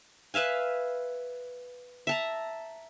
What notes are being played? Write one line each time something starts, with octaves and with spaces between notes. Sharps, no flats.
B4 E5 F5 G#5
E5 A5 A#5